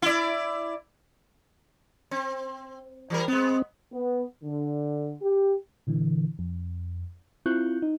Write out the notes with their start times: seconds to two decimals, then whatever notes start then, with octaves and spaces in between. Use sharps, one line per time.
0.02 E4 D5
2.11 C4
3.10 E3 G3 A#4
3.28 G#3 B3 C4
3.93 B3
4.44 D3
5.22 G4
5.87 A#2 D3 E3
6.39 F2
7.46 C4 E4 F4 C#6 F#6 G6
7.82 D#4